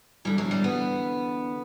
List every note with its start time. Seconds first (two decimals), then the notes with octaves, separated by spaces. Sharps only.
0.25 E2 D3 G3
0.38 F#3
0.51 G3
0.64 B3